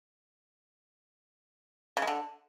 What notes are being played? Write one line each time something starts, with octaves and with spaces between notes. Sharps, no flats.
C#3
G#3
D3